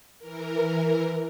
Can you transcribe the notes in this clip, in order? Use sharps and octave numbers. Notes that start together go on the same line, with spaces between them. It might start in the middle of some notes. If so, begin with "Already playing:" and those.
E3 A#4